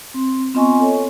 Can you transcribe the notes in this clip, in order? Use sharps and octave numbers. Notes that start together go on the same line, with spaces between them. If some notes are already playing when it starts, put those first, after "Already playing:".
C4
B3 C4 F4 D#5 G#5 C#6
A4 C#5